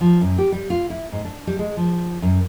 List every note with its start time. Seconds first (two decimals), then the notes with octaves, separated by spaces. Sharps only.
0.01 F3
0.21 F#2
0.38 G4
0.52 G3
0.70 F4
0.90 E4
1.12 G#2
1.25 D4
1.47 G3
1.59 G#3
1.77 F3
2.22 F#2